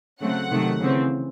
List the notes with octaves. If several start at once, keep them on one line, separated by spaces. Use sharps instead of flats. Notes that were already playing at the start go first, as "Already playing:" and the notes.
C#3 F#3 A3 C4 F#5
C3 D#3 F#3 A3
C#3 E3 C4